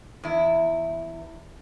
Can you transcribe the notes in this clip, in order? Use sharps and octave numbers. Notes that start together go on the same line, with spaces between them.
E2 E4